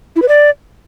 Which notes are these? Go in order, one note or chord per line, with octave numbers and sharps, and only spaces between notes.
E4
B4
D5